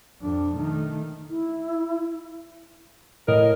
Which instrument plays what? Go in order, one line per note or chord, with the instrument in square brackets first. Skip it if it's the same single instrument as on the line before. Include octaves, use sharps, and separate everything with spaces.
[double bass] F2 D4
D#3 A3
[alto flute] E4
[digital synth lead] A2 [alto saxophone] A#4 [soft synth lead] D#5